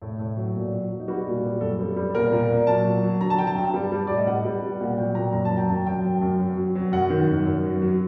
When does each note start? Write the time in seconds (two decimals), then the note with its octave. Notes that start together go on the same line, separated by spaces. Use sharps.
0.02 A2
0.19 A2
0.37 F#3
0.56 A#2
0.72 F#3
0.91 F#3
0.99 D#4
1.08 G3 F#4
1.27 A#2
1.43 G3
1.61 F#2 A4
1.79 G3
1.96 G3
2.15 A#2 A#4
2.32 A#2
2.50 A#2
2.67 F#3 A5
2.85 F#3
3.03 F#3
3.21 D3 A#5
3.30 A5
3.38 F#3 G5
3.47 A5
3.56 G2
3.74 G3
3.92 G3
4.07 A2 D5
4.17 D#5
4.27 G3 F#5
4.45 G3
4.62 G3
4.80 A#2 F#5
4.98 F#3 G5
5.15 A#2 A#5
5.33 F#2 A#5
5.45 A5
5.51 F#3
5.57 G5
5.69 F#2 A5
5.86 F#2 G5
6.03 F#3
6.21 F#2
6.40 F#3
6.57 F#3
6.75 F#3
6.92 F#2 F#5
7.10 D#3
7.27 F#2
7.46 F#2
7.64 F#3
7.82 F#3